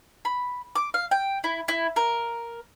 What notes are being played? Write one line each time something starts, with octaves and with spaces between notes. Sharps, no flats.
B5
D6
F5
G5
E4
E4
A#4